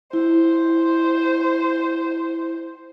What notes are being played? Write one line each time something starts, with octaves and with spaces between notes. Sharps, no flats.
E4 C5